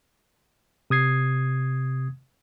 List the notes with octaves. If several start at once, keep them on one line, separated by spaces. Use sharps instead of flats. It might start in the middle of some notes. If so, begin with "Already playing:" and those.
C3 D#6 G#6 C7